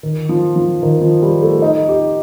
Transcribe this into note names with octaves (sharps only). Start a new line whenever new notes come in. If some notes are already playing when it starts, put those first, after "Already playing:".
D#3
F3
F3
D#3
F3
G3
A3
D#4
G4